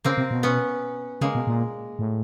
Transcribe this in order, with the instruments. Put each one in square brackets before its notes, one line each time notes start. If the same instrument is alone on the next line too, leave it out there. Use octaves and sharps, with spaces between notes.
[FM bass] C#3 [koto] A#3 C4
[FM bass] C3
B2
[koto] B3 C#4
[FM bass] C#3 [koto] G#3 A#3
[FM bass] B2
A#2
A2